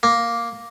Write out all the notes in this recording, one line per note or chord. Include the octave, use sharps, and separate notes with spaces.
A#3